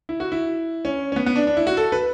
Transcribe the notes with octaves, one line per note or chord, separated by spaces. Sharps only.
E4
F#4
E4
C#4
C#4
B3
B3
D4
D4
E4
F#4
A4
B4